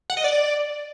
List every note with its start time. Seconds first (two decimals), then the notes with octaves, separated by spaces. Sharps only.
0.10 F#5
0.17 D#5
0.24 D5